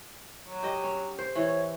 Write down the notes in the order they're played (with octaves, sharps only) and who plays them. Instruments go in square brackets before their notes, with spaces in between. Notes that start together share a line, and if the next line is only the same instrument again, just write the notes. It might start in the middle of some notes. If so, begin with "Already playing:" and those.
[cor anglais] F#3
[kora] G4 D#5
C#4
C5
[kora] E3 [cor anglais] C#5